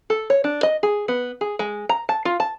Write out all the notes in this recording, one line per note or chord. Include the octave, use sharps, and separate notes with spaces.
A4
C#5
D4
D#5
G#4
B3
G#4
G#3
A#5
A5
F4
A5